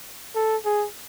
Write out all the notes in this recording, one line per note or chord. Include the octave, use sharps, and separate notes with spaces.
A4
G#4